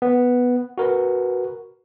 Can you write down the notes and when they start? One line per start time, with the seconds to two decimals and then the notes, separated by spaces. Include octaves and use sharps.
0.02 B3
0.78 F#4 A#4 B4